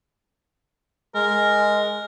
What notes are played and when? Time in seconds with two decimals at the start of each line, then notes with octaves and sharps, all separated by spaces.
1.15 G#3 A#4